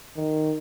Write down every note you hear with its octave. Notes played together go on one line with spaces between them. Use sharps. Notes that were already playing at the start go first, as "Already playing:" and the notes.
D#3